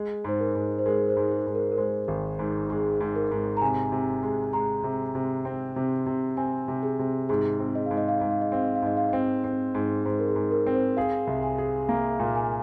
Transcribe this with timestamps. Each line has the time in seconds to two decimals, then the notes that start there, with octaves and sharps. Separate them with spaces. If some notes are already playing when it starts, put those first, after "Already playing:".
Already playing: G#3 D#5
0.24 G#2 C5
0.40 A#4
0.56 G#2
0.79 C5
0.86 G#3 A#4
1.09 C5
1.17 G#2
1.31 G#4
1.47 G#2
1.55 A#4
1.72 A#4
1.77 G#3 C5
2.08 G#1
2.39 G#2
2.70 G#3 G#4
3.01 G#2
3.16 A#4
3.31 G#2
3.57 A#5
3.62 C3 G#5
3.92 C3
4.23 G#3
4.53 G#3 A#5
4.84 C3
5.15 C3
5.45 C4
5.76 C3
6.06 C3
6.37 C4 G#5
6.68 C3
6.83 G#4
6.99 C3
7.29 G#2 G#4
7.60 C4
7.75 D#5
7.86 G#2 F5
7.97 D#5
8.08 F5
8.19 G#2 D#5
8.31 F5
8.41 D#5
8.52 C4 F5
8.64 D#5
8.75 F5
8.82 G#2 D#5
8.97 F5
9.09 C4 D#5
9.44 C4
9.75 G#2
10.05 G#2 C5
10.19 A#4
10.28 G#4
10.36 G#2
10.51 A#4
10.66 C4
10.74 C5
10.97 G#4 F5
11.27 C2
11.43 G#5
11.58 G#4
11.88 A#3 F5
12.20 A#2
12.35 G#5